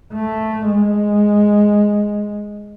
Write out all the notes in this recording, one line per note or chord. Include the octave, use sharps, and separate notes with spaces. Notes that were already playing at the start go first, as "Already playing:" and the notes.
A3
G#3